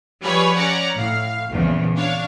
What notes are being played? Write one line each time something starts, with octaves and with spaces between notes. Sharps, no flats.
F3 G3 G#4 B4 C#5
C#4 D5 F#5 A#5
A2 F5
A#1 E2 C#3 G3
D4 C#5 F5